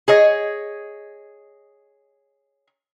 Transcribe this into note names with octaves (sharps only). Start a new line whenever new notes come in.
G#4 C#5 D#5